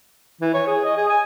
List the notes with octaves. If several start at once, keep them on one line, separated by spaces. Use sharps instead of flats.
E3
C#5
G#4
D#5
G#4
G#5